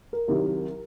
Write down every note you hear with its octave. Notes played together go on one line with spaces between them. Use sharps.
A#4
C2 C3 D#3 F#3